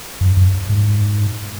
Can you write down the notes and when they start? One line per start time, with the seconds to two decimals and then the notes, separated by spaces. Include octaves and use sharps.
0.21 F#2
0.37 F#2
0.70 G#2